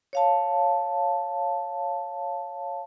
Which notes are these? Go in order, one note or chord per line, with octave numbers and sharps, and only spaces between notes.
C#5 F5 A5